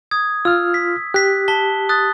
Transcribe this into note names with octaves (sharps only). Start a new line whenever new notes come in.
D#6 G#6
F4 E6 F6
B6
G4 F#6 B6
A5 B6 G7
D#6 F#6 A6